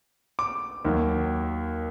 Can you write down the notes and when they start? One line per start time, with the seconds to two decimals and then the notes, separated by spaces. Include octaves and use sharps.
0.39 D6
0.85 D#2 D#3 F#3